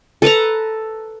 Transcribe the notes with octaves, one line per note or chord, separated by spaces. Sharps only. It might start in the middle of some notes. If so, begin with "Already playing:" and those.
A4 B4 A5 A#5